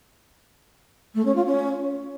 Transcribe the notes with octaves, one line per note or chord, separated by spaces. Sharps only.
A3
C#4
F4
C#4